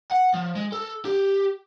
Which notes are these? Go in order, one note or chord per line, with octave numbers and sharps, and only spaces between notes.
F#5
F3
G#3
A4
G4